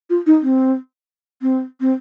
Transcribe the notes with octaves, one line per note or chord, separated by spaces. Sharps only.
F4
D#4
C4
C4
C4